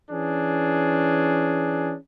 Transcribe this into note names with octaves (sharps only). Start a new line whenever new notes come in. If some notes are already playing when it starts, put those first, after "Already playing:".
E3 C#4 D4 G#4